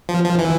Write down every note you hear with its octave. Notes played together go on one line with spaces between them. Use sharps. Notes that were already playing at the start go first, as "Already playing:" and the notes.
F3
F3
E3